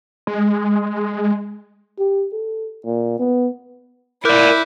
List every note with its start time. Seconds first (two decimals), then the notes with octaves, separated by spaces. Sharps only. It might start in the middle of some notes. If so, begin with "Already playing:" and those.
0.27 G#3
1.99 G4
2.32 A4
2.85 A#2
3.19 B3
4.25 E4 A#4 D5 D6 F#6 G6